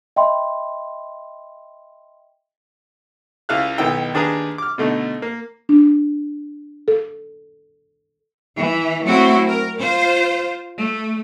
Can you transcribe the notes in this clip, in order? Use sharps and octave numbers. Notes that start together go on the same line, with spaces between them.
D#5 E5 G5 B5 C6
C#2 E4 E5 F5 F6 F#6
B1 D#3 B3 E4 G5 E6
D#2 D4 G#4 B4 A#5 D#6
D6 F6
B2 D3 A3 D#4
A#3
D4
A4
E3
F#3 A3 C4 E4 F#4
A#4
F4 C5
A3